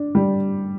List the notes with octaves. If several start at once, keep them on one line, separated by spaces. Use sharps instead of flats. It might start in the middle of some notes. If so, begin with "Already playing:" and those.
Already playing: D4
G3